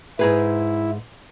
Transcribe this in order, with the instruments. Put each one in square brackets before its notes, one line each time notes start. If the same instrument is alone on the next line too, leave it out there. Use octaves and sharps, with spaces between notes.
[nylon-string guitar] G#2 G#4 B4 [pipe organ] E4